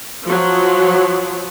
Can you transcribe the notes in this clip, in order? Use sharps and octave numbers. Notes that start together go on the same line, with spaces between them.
F3 F#3